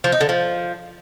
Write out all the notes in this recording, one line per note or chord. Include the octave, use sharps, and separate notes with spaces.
F3
D#4
D3
F3